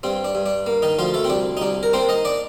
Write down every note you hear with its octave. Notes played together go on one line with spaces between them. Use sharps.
G2 C4
D4
G2
D4
A#3
D#3 D#4
D2 F3 F4
A3 A4
C4
C2 D4
D#4
C2 D4
A#4
A#3 C4 C5
D#4 D#5
D4 D5